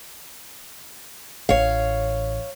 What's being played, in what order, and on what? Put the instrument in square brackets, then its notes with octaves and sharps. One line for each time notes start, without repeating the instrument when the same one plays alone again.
[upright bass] A1 [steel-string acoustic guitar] C#5 F5